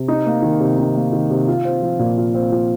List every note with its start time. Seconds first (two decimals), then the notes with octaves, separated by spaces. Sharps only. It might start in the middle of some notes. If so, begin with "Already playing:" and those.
Already playing: C3
0.08 D#4
0.26 A#3
0.42 D#3
0.60 C3
0.78 D#4
0.95 A#3
1.13 D#3
1.30 C3
1.48 F4
1.65 C4
1.82 F3
1.99 A#2
2.17 F4
2.34 C4
2.52 F3